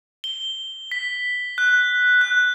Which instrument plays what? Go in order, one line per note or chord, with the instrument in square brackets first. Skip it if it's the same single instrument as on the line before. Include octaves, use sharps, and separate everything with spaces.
[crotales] G7
B6
F#6
F#6